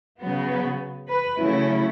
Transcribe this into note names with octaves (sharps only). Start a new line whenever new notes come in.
C#3 F#3 B3
B4
B4
C#3 F#3 A3 C#4 E4